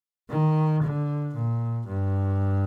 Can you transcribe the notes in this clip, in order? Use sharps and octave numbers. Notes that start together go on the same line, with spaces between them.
D#3
D3
A#2
G2